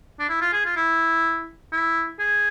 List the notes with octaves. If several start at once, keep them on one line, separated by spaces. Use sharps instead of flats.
D4
E4
F4
G#4
F4
E4
E4
G#4